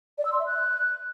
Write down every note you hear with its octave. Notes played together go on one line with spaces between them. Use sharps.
D5
E6
C6
E5
F#6